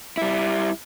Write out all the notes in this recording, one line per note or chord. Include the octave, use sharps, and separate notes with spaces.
G3 E4